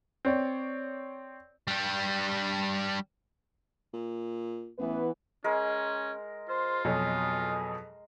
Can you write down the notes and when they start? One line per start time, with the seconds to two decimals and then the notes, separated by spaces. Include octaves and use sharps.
0.25 C4 C#5 D5
1.68 G3 D4
3.93 A#2
4.79 A1 E3 B3 B4
5.44 G#3 C#4 A#4
6.49 F4 C5
6.85 F2 B2 F#3 G#4